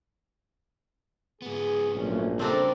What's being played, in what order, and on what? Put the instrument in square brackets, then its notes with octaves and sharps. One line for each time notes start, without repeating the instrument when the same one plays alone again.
[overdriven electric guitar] G#2 B3 [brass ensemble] G#4
[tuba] A#1 [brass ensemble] F#3 A3 C#4
[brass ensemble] F2 A3 A4 [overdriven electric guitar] C#3 G3 [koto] C4 D4 A#4